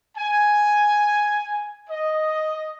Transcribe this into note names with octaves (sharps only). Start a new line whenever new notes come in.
G#5
D#5